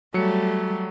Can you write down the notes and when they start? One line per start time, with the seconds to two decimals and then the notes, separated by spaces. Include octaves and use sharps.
0.14 F#3 G3 A3 C#7